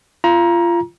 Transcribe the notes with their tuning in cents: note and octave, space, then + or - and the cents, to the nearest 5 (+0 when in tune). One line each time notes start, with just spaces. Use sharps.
F4 -25 A#5 +20